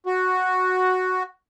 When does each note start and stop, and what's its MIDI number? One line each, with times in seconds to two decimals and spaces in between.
0.06 1.23 66